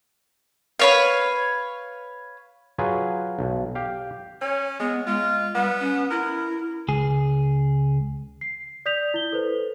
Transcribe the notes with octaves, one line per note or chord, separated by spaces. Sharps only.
B4 C#5 F5
F#3 F4 G#4 B4
B1
G4 F5
C#4 C#5
G#3 B3
G#3 F4
G3 B3
C#4
E4 A#4
C#2 G#4
C7
D5 D#6 G6 B6 F7
E4 G7
A4 B4 C5